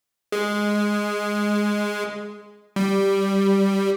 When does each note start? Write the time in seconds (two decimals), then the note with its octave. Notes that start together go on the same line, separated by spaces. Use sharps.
0.32 G#3
2.76 G3